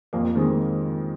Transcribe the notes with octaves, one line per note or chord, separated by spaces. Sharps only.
F2 A#3
D#3 G#3 C4